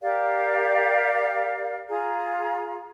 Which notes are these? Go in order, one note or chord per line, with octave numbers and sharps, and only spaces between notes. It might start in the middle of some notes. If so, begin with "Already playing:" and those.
G4 A#4 D5 F5
F4 G#4 A#5